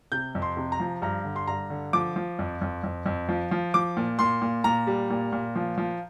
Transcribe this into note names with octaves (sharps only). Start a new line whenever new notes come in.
C3 G6
F2
C6
C3
A#5
F3
G2 A#5
D3
C6
G2 A#5
D3
F3 D6
F3
F2
F2
F2
F2
F3
F3
F3 D6
A#2
A#2 C6
A#2
A#2 A#5
G3
A#2
A#2
F3
F3